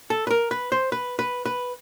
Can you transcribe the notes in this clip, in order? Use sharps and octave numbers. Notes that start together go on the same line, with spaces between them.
A4
B4
A#4
B4
C5
B4
B4
B4